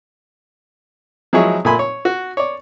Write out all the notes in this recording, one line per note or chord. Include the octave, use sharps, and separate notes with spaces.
F3 F#3 G#3 E4 G#4 C#5
A#2 A3 G#5 B5 C6
C#5
F#4
C#5 D5